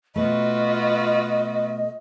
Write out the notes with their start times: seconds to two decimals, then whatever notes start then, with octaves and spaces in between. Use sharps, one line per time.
0.16 B2 A3 F4 F#4 B4 D#5